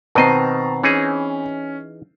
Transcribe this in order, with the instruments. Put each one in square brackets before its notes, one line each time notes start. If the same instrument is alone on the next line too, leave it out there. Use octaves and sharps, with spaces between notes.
[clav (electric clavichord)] B2 D#3 D#5 [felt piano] C4 B4 [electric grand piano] A5 A#5 C7
[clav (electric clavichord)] E3 D#4 G#4 [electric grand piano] C#4